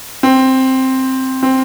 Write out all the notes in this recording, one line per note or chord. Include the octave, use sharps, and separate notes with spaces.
C4
C4